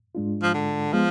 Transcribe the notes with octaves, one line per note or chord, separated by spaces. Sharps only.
G#2 G#3 D4 F4
F3
D3
F3 G#3 B3